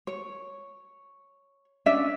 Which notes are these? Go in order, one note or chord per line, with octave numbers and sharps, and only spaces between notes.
C#5
C#4 D4 D5 E5